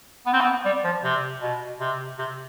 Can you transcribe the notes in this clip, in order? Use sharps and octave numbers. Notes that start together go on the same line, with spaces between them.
B3
C4
B3
G3
F3
C3
B2
C3
C3